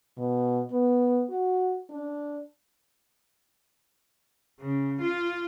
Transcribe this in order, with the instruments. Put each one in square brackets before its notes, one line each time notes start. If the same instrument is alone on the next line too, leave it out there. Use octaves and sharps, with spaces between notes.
[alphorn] B2
B3
F#4
D4
[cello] C#3
F4